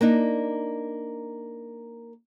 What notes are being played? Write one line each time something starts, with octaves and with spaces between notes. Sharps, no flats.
A#3 D4 D#4